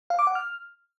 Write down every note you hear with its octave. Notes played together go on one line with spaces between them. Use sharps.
F5
D6
F#5
F6